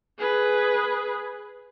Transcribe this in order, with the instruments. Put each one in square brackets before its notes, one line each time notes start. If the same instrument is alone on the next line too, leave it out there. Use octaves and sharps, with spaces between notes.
[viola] G#4 B4